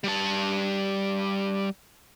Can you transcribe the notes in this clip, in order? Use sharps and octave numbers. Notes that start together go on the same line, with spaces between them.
G3 A5